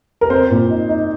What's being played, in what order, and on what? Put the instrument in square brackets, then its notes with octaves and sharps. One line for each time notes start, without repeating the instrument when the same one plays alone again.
[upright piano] A#4
C4 C5
A#2
D#4
D#4